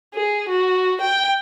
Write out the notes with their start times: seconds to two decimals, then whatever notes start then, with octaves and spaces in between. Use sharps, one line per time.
0.15 G#4
0.49 F#4
1.01 G5